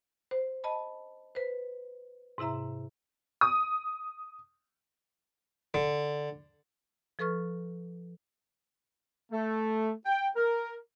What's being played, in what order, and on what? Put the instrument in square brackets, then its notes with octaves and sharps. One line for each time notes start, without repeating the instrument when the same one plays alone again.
[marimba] C5
D#5 A5 B5
B4 C5
G#2 C3 E4 E5 A#5
[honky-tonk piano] D#6
[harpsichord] D3
[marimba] F3 A4 B4 C#6 F6
[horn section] A3
G5
A#4